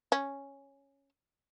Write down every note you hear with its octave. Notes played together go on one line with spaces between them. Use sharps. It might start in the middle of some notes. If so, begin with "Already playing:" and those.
C#4